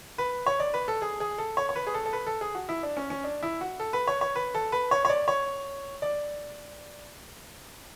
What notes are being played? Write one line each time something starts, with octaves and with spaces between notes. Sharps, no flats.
B4
C#5
D5
B4
A4
G#4
G#4
A4
C#5
C#5
B4
G#4
A4
A4
B4
A4
G#4
F#4
E4
D4
C#4
C#4
D4
E4
F#4
A4
B4
C#5
C#5
B4
A4
B4
C#5
C#5
D5
C#5
D5